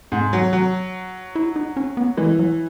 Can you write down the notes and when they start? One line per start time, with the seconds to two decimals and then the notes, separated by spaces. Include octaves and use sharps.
0.12 G#2
0.33 F#3
0.53 F#3
1.35 E4
1.56 D#4
1.77 C#4
1.97 B3
2.17 E3 G#3
2.39 F#3